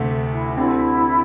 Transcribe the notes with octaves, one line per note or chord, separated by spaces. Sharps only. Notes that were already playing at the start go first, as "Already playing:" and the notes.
Already playing: D2 C3 A3
E4
D2 D3 C4 E4 G4